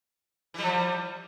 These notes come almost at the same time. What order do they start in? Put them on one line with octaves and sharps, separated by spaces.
E3 G3 F3